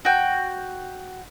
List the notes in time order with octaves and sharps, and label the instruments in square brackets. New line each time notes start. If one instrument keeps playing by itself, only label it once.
[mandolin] F#4 G5